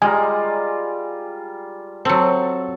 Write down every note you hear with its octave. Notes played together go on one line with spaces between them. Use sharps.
G3 G#3 F4 G#5 A#5
F#3 C4 A4